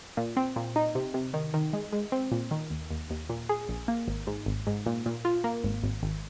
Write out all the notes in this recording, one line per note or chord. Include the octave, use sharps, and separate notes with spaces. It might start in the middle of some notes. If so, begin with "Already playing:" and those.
A#2
C4
A#2
D#4
C3
C3
D#3
D#3
G#3
G#3
C4
A#2
D#3
D#2
D#2
D#2
A#2
G#4
A#1
A#3
G#1
G#2
G#1
G#2
A#2
A#2
F4
A#3
G#1
G#1
G#1